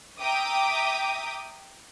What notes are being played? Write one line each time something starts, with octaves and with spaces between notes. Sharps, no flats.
E5 G5 A#5 D6 D#6